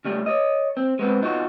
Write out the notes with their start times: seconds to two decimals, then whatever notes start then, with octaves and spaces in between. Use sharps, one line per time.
0.05 C#3 G3 A3
0.26 C#5 D#5
0.77 C4
0.99 G#3 B3 C4
1.21 B2 D#4 F4 F#4